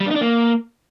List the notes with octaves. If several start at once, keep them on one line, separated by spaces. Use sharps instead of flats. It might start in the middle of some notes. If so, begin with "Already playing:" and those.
G3
D4
D#4
D4
A#3